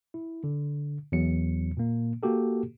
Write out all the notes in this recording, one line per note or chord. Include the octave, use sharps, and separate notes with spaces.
E4
D3
E2 F#3 C#7
A#2 A#3
A#3 F#4 G4 A4